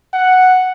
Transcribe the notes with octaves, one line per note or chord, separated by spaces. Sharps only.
F#5